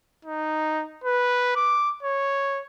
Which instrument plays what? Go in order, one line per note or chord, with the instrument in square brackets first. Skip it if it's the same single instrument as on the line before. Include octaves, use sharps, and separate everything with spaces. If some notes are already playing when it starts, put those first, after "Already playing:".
[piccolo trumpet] D#4
B4
D6
C#5